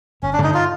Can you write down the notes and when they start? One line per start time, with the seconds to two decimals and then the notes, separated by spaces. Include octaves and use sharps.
0.23 G1 C#4
0.33 D4
0.38 G2 D3 G3 D#4
0.54 F4